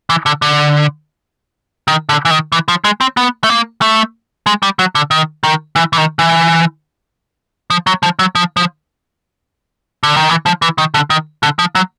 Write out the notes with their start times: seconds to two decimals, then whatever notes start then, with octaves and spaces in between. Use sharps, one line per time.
0.10 E3
0.26 D3
0.42 D3
1.88 D#3
2.09 D3
2.25 E3
2.31 D#3
2.52 E3
2.68 F3
2.84 G#3
3.01 C4
3.17 B3
3.44 A3
3.49 A#3
3.82 A3
4.46 G#3
4.63 G3
4.79 F#3
4.95 D3
5.11 D#3
5.43 D#3
5.76 E3
5.93 E3
5.98 D#3
6.19 E3
7.70 F3
7.87 F#3
8.03 F3
8.19 F#3
8.35 F3
8.57 F3
10.03 D3
10.16 D#3
10.30 E3
10.46 F3
10.62 E3
10.78 D#3
10.94 D3
11.10 D#3
11.43 D3
11.59 F3
11.75 F#3